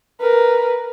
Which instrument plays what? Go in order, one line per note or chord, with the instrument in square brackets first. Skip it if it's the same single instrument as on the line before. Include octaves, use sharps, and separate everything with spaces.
[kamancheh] A#4 B4